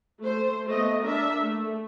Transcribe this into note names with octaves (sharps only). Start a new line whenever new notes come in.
A3 C5
A3 B3 D#5
D4 A#4 E5
A3